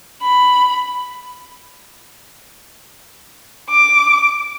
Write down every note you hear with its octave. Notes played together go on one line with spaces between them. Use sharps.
B5
D6